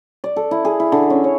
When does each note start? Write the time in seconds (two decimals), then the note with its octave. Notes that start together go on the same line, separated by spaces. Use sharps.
0.24 D5
0.36 A4
0.51 E4
0.65 G#4
0.80 E4
0.92 D3
1.10 C#4
1.24 C#5